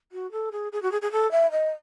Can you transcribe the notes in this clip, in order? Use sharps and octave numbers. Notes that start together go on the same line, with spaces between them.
F#4
A4
G#4
G#4
F#4
G#4
G#4
A4
E5
D#5